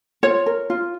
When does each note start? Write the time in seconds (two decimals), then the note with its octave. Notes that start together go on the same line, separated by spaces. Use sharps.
0.23 F4 C#5
0.46 A#4
0.70 F4